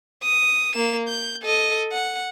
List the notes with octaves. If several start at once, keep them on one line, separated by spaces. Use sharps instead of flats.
D#6
A#3 E7
G6
A4 D#5
F#5